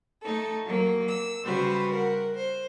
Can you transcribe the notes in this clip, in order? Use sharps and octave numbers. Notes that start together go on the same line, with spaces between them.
A3 D#4 A4
F#3 A#3
E6
C#3 G3 F#4 B4 C5
A#4 F#5
C5